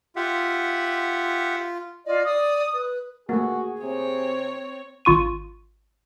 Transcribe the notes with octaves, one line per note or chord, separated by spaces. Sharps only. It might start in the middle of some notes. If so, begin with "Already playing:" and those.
F4 G4 E5 F#5
F4 D5 D#5
D5 D#6
B4
A3 A#3 F#4 G#4
C3 C4 C#5
G#1 F4 C#6 D#7